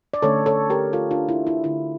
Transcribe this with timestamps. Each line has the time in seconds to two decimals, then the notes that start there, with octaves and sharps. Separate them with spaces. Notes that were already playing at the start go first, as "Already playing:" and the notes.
0.14 D5
0.22 D3 A3 C#4 A4 C#5
0.46 A4 C#5
0.70 G4 A#4
0.93 F4 A4
1.11 D4 F4
1.29 E4
1.47 E4
1.64 D3 A3 D4 E4